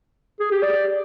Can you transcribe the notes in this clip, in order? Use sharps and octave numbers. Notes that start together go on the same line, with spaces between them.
G#4
G4
D5